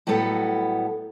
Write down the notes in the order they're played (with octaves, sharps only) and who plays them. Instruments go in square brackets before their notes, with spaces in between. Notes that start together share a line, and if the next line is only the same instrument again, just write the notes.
[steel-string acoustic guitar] A2 F#3 G3 B3 A4